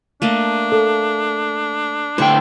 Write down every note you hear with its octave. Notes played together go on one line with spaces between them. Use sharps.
A3 A#3 D4 D#5
A4
A2 D3 C5 G5 C#6